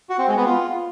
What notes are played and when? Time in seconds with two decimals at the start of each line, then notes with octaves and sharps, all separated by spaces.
0.09 F#4
0.18 C4
0.28 G#3
0.37 B3
0.46 F4